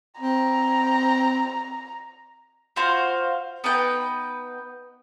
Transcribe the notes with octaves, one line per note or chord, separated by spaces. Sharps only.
C4 A#5
F4 F#4 C5 F5
B3 D#4 B4 G5